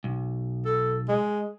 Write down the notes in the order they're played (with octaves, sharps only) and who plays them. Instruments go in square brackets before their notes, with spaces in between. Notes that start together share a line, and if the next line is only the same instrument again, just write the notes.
[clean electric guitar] B1
[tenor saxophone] A4
G#3